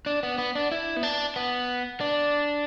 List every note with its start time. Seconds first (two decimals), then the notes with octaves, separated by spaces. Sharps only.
0.06 D4
0.23 B3
0.38 B3
0.55 D4
0.72 E4
0.97 B3
1.03 D4
1.36 B3
2.01 D4